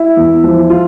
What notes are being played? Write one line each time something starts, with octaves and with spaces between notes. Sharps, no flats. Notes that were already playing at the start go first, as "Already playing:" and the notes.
Already playing: E4
E2
F3
F4